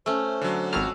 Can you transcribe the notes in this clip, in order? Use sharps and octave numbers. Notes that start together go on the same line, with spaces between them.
A3 C#4 C5
D3 F#3
G#1 F2 F#4 E6 F6